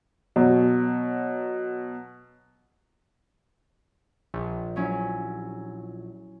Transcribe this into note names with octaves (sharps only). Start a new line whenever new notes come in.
B2 F#3
A#1
F#3 C#4 E4